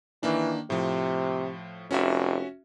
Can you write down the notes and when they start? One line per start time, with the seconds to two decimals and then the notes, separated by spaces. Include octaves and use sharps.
0.23 D#3 E3 A#3 D4
0.70 A2 C3 F3
1.91 F1 C#4 F#4 E5